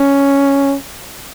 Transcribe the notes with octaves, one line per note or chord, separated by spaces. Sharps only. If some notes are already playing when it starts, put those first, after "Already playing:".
Already playing: C#4